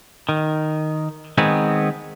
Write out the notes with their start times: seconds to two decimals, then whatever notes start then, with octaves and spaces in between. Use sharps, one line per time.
0.29 D#3
1.38 D#3 G#3 B3 C4